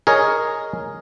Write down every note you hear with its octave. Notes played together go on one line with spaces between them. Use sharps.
G#4 A#4 C#5 D#5